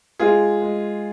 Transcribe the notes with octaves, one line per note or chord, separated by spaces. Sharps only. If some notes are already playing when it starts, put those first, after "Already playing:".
G#3 F4 G#4
G#3